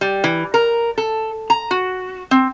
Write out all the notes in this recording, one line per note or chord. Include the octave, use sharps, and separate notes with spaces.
G3
E3
A#4
A4
A#5
F#4
C4